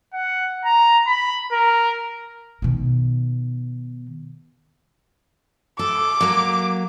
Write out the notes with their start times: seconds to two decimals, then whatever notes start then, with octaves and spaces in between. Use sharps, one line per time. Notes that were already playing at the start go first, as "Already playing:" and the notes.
0.13 F#5
0.65 A#5
1.07 B5
1.52 A#4
2.62 B2 D#3
5.79 A4 D6
6.21 F#3 A#3